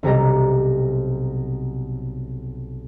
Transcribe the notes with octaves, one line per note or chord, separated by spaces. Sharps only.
B1 C3 G3 A#5